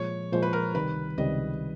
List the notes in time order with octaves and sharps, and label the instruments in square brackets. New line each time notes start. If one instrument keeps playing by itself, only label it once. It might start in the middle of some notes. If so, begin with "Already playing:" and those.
Already playing: [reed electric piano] A#2 F3 G#3 [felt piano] C#5
[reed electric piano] A#2 F3 G#3 [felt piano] C5
[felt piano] B4
A#4
[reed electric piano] C#2 C3 D#3 G3 [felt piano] B4
[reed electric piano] C#2 C3 D#3 G3 [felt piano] D#5